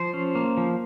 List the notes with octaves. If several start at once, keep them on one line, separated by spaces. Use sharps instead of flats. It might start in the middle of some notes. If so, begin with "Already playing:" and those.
Already playing: F3 C5
C#4
A#3
F3